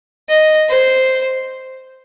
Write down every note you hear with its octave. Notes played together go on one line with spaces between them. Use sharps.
D#5
C5